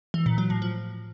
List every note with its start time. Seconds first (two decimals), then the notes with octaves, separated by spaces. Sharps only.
0.14 E3
0.26 A#2
0.38 F#3
0.50 A2
0.62 F3